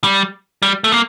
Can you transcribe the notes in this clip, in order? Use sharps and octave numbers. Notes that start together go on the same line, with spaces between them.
G3
G3
A3
A#3